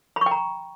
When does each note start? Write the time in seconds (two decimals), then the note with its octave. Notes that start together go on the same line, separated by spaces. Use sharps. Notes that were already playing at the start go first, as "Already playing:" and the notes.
0.16 B5
0.21 C#6
0.26 G5
0.31 A#5